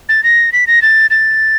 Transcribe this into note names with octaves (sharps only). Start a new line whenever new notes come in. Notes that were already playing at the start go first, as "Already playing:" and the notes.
A6
A#6
B6
A#6
A6
A6